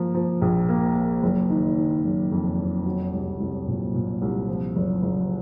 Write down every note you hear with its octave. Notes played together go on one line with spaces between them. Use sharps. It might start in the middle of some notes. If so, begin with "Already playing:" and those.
Already playing: F3 A#3
F3
A#1
A#3
A#3
F#1
D#3
D#3
F#1
F2
F#1
F#3
C2
C2
A#2
A#2
C2
F3
F#1
F#1